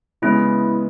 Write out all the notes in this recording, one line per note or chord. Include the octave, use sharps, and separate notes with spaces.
C#3 E3 G#3 B3 E4